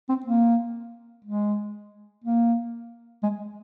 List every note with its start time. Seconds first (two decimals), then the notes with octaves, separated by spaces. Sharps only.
0.09 C4
0.26 A#3
1.25 G#3
2.24 A#3
3.23 G#3